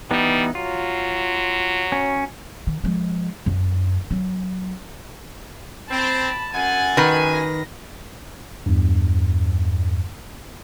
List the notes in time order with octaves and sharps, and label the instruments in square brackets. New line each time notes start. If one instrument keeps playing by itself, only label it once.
[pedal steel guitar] E3 B3 D#4 [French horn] G3
[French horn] F#3 [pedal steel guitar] F4
[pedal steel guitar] C#4
[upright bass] D#3
F3 G#3
F#2
F#3
[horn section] C4 [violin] A5 B5
[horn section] F#2 G#5 [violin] F#5 A6
[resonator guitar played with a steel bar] D#3 B4
[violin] A#6
[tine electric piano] E2 G2